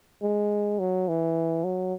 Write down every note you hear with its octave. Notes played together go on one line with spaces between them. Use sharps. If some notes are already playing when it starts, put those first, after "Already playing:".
G#3
F#3
E3
F#3